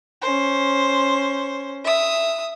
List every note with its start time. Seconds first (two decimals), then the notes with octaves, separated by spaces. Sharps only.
0.21 C#4 C5
1.84 E5 D#6